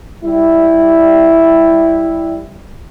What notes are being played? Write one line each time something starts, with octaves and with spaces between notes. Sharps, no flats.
G3 E4